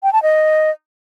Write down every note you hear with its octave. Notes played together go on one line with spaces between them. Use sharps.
G5
A5
D#5